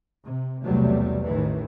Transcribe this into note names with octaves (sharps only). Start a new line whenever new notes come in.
C3
B1 E2 C3 F#3 G3 A3
A1 A2 D#3 E3